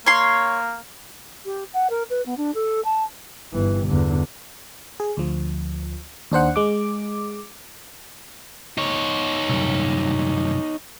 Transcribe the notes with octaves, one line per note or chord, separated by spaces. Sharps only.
A#3 C#5 C6
G4
F#5
A#4
B4
B3
D4
A4
A5
G1 E3
E2 D3
G#4
D2 F3
D#2 D4 C5 F#5
G#3 D6
D#4 C#5
C2 F#2